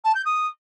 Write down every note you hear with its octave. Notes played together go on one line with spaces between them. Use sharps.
A5
G6
D#6